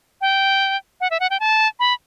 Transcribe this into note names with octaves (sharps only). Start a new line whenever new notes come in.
G5
F#5
E5
F#5
G5
A5
B5